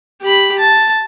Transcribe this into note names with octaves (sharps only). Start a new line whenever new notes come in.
G4 B5
A5